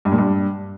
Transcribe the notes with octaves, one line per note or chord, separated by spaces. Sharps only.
G2
A#2
G2